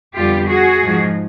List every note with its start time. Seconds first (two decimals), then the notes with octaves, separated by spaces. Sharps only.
0.16 F2 D3 G3 B3 F4 G4
0.49 F#4 G#4
0.82 G#2 F3 G#3